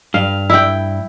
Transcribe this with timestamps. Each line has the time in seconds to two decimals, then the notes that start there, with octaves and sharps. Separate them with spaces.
0.14 G2 F5
0.50 E4 G5